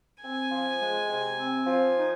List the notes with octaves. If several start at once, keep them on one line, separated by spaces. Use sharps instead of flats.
C4 G#5
F3
G#3
C3
C4
F3
D#4